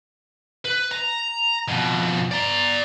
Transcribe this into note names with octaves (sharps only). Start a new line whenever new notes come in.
B4
A#5
F2 B2
D5 A#5